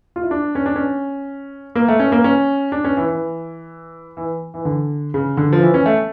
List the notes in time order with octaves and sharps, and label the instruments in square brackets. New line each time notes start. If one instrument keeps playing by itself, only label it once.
[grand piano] F4
E4
D4
C#4
D4
C#4
A#3
A3
C#4
A#3
C#4
D4
C#4
E3
E3
E3
E3
D3
C#3
D3
F3
E3
C#4
A3